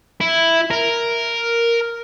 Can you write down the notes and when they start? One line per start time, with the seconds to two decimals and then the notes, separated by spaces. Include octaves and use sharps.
0.20 E4
0.70 A#4